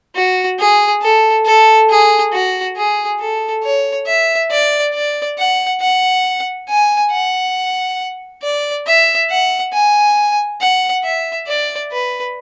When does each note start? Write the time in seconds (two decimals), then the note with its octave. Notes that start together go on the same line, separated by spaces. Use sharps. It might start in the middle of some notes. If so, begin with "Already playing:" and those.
0.15 F#4
0.59 G#4
1.01 A4
1.45 A4
1.90 G#4
2.32 F#4
2.76 G#4
3.19 A4
3.63 C#5
4.07 E5
4.51 D5
4.93 D5
5.38 F#5
5.81 F#5
6.69 G#5
7.11 F#5
8.42 D5
8.87 E5
9.30 F#5
9.73 G#5
10.61 F#5
11.03 E5
11.47 D5
11.91 B4